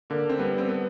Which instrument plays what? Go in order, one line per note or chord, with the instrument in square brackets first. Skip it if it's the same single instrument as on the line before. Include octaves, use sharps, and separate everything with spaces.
[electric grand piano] D3 [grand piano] A#3
[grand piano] C4
[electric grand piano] G3 [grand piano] B3
[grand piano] C4
B3